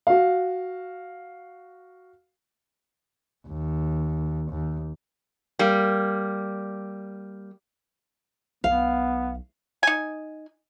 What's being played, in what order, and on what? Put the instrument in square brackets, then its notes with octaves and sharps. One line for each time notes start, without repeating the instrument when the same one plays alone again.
[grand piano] F#4 F5
[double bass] D#2
D#2
[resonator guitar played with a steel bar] G3 A#3
[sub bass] B1 [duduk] B3 [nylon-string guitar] F5
[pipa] D#4 G#5